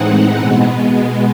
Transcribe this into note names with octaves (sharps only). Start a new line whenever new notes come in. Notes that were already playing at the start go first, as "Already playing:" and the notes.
Already playing: A2 E3 G#3 C4 D#4 F#5
B2 G#3 B3